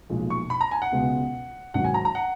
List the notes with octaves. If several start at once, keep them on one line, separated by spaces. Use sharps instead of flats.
B1 A#2 F3 G#3
C#6
B5
A#5
G#5
F#5
C#2 B2 G#3 B3
G#1 G#2 F#3 F#5
G#5
A#5
A#5
F#5